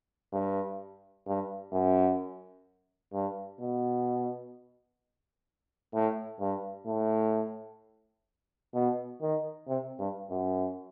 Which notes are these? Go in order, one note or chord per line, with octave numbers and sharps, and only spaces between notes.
G2
G2
F#2
G2
B2
A2
G2
A2
B2
D#3
C3
G2
F#2